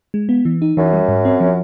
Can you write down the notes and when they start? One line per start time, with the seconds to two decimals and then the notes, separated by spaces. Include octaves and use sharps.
0.14 G#3
0.29 B3
0.45 E3
0.62 D#4
0.77 F#2 E3
0.93 G3
1.08 G#2
1.25 C4
1.40 F3